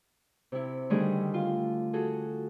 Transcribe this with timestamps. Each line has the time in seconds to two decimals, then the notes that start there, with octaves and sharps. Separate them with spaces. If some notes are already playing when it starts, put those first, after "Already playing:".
0.52 C3 E4
0.90 D3 D#3 G3 A3 D4 G#4
1.34 F4
1.93 F#4 G#4 A4